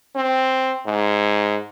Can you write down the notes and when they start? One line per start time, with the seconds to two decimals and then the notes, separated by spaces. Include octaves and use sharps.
0.16 C4
0.86 G#2